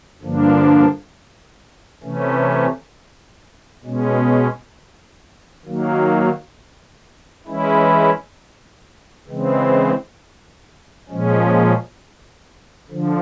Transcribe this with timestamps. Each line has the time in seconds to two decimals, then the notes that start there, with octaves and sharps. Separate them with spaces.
0.22 G2 D3 F3 A#3 D4
2.03 C3 E3 A3 C#4
3.84 B2 G#3 C#4
5.65 D#3 F#3 A#3
7.47 E3 G#3 C#4 E4
9.28 C#3 E3 G#3 C4
11.09 A#2 F3 G#3 C#4
12.91 D3 F3